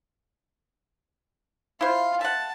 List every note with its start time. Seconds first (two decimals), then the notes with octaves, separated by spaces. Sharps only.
1.81 E4 F4 C5 F5
2.21 E5 F#5 A5